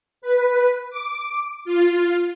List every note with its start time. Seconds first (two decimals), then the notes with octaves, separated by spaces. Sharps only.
0.22 B4
0.90 D6
1.65 F4